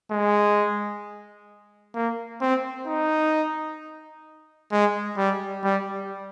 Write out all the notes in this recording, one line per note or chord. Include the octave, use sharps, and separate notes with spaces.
G#3
A#3
C4
D#4
G#3
G3
G3